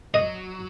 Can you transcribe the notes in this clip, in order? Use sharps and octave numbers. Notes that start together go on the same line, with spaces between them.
F#3 D#5